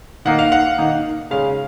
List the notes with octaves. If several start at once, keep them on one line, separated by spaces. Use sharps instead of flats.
D#3 A#3 D#4 F#5
F5
F#5
D#3 A#3 D#4
C#3 G#3 C#4 F5